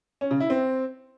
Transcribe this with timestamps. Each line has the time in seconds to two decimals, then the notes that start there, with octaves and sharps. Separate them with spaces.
0.21 C#4
0.31 C#3
0.40 E4
0.50 C4